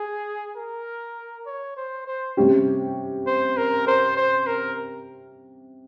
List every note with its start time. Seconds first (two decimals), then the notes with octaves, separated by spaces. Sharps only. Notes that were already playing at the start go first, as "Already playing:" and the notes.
Already playing: G#4
0.56 A#4
1.46 C#5
1.76 C5
2.07 C5
2.37 C3 G3 C#4 G4
3.27 C5
3.57 A#4
3.87 C5
4.17 C5
4.47 A#4